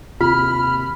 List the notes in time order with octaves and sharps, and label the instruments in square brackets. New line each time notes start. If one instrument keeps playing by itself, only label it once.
[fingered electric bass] D#2 C3 [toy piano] F4 [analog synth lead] B5 [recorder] F6